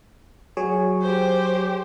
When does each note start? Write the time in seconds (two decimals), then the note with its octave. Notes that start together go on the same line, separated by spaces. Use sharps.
0.57 F#3 G#4 C#5
1.01 G4 C5